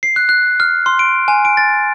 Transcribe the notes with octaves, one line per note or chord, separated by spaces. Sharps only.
C7
F#6
F#6
F6
C6
D7
G#5
D7
A6